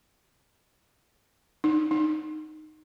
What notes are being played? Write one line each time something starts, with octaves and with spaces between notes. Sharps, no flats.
D#4
D#4